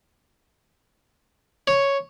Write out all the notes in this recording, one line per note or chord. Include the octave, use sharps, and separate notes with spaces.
C#5